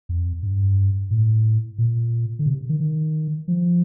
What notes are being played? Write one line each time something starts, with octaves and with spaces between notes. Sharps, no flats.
F2
G2
A2
A#2
D3
C3
D#3
D#3
F3